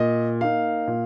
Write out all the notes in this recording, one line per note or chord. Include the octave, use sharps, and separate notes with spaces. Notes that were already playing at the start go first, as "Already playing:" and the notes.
Already playing: A#2 D#5
A#3 D#4 F5
A#2